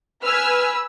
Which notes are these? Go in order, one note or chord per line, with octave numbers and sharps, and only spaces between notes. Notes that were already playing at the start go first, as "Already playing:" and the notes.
B4 G#5 E6 F6